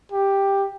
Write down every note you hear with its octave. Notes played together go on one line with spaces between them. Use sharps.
G4